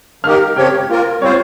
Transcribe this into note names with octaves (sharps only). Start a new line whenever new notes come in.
D#3 A#3 D#4 G4 A#4 F6
C#3 F3 C4 G4 C#5 G5
A#3 F4 A#4
G3 C4 F4 C5 C#5